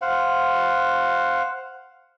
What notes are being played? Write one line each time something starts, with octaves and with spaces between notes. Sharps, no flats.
C5 F5 F#5